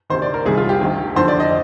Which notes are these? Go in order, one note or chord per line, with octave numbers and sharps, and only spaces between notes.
D2 C3 D#3 C5
D5
A#4
C2 C3 D#3 G#4
F4
G4
D2 C3 D#3
F2 D3 C5
D5
D#5